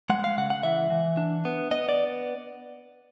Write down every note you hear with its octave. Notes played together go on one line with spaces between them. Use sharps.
G#3 F#5
F5
C#3 F#5
F#5
E3 E5
E3
D4
B3
B3 D#5
D5